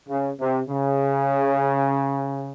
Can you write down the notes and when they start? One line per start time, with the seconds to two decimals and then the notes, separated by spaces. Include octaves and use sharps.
0.09 C#3
0.39 C3
0.68 C#3